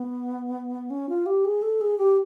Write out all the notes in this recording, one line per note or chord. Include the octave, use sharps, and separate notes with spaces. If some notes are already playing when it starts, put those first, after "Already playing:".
Already playing: B3
C#4
F4
G4
G#4
A4
G#4
G4